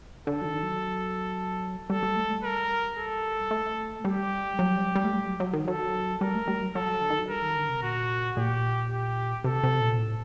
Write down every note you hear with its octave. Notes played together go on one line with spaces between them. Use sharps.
D3 A4
F#3
D#3
F#3
G3 A4
G3
A3
G3
A#4
A4
A3
G3 G4
F#3
G3
G3
A3
G3
F#3
F#3
D#3
F#3 A4
G3 A#4
A3
G3
F#3
F#3 A4
D3
D#3
F#3
G3 A#4
D#3
D3
C3
A#2 F#4
A#2 G4
G4
C3 A4
C3
A#2
A2